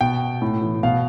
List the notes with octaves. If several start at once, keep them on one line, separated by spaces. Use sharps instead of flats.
B2 G5
A2
E3
B2 F5